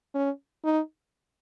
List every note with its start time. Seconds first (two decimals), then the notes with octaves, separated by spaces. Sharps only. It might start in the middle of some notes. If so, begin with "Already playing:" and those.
0.15 C#4
0.64 D#4